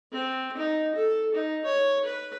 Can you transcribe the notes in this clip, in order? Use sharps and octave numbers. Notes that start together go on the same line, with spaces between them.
C4
D#4
A4
D#4
C#5
B4